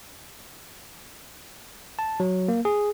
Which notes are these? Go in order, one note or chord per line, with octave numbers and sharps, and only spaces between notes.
A5
F#3
A#3
G#4